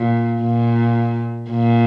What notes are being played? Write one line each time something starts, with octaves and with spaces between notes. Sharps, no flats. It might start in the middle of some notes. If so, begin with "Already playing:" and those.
Already playing: A#2
A#2
A#2